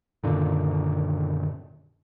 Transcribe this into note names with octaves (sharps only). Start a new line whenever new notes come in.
F#2 A#2 D3 D#3